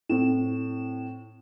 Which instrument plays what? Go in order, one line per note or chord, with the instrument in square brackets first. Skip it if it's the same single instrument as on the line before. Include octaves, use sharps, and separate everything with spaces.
[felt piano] A2 [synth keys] C4 E7